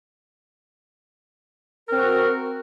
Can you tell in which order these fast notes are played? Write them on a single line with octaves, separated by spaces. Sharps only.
A#4 C4 F#4